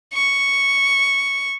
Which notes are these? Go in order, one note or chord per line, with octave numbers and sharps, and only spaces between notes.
C#6